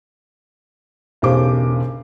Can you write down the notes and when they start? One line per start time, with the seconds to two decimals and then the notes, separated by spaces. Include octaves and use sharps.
1.22 E1 B1 C#3 G4 C5 D6